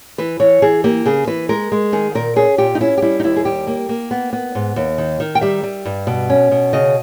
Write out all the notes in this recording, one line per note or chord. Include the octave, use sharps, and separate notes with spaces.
E3 B4
E3 C#5
E3 G#4
A#3 G4
C#3 G#4
E3 B4
G#3 A#4
G#3
D#3 G#4
A#2 A#4
C#4 G#4
A#2 G4
D#4
C#4 E4
G4
G3 E4
D#4
D#2 E4
G#4
G3 G4
A#3
A#3
B3
B3
G#2
D#2
D#3
D#3
G5
G3 E5
G3
G2
B2
C#4
B2
C#3 D#5